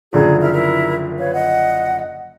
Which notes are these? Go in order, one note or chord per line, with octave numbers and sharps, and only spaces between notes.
F#1 D3 F3 G#4 A#5
E4 A#4 F6
E4 A#4
B4 C#5 F5
D#5 F#5